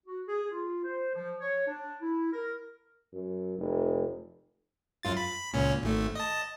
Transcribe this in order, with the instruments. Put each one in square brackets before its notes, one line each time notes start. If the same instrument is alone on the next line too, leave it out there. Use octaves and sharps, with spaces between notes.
[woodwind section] F#4
G#4
F4
C5
F3
C#5
D4
E4
A#4
[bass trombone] F#2
F1
[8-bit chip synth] F#2 F4 A6
B5
C#2 A#2 C#4
G#1 A3
D#5 A5